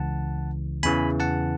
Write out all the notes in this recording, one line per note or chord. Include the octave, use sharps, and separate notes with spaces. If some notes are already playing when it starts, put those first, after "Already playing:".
Already playing: C#2 C#3 E3 F#5 A5
E2 C#3 E3 G#5 B5
F#5 A5